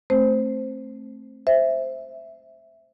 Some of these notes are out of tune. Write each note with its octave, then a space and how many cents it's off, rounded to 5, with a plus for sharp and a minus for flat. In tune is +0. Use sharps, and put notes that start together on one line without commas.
A3 +0 C4 +20 C5 -5
C5 +0 E5 +0